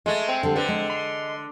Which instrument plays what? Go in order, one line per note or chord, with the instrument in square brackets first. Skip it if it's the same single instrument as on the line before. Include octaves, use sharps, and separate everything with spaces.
[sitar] G#3 A3 [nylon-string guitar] D#5
[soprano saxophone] C4
[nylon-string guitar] D3 G3 A4
[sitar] D3 [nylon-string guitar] B4 C5
[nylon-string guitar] G#3
[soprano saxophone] C6